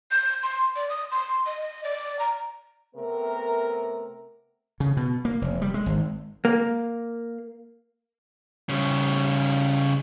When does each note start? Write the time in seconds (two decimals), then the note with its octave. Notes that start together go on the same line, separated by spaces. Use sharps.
0.11 G6
0.43 C6
0.76 D5
0.90 D#6
1.11 C6
1.46 D#5
1.62 D#5
1.84 D5
2.19 A#5
2.95 C3 A3 B3 A#4
4.80 C#3
4.97 B2
5.25 A#3
5.41 F1
5.62 G3
5.74 G#3
5.86 G#1
6.45 A#3
8.69 C#3 G3